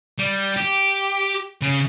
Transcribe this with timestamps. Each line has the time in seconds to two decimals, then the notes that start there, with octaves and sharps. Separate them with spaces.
0.19 G3
0.57 G4
1.62 C#3